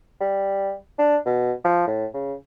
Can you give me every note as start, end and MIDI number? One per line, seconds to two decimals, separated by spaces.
0.21 0.73 55
0.99 1.17 62
1.26 1.53 47
1.64 1.85 53
1.87 2.06 45
2.14 2.34 49